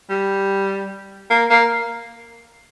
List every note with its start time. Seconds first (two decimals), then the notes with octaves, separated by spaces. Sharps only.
0.09 G3
1.30 A#3
1.50 A#3